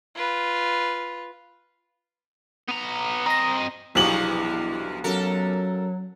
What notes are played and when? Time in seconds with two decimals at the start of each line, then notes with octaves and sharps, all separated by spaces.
0.15 F4 B4
2.68 B3 A#5
3.26 C4 D#5 A#5 A#6
3.95 B1 E2 G2 C3 F3 F#7
5.04 F#2 F#3 A4 A#4